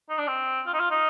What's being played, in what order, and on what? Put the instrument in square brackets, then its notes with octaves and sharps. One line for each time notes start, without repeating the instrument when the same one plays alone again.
[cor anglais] D#4
D4
C4
F4
D#4
F4
D#4